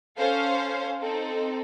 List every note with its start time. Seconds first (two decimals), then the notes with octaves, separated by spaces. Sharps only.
0.18 C#4 A4 C5 F5
1.01 C4 D#4 A4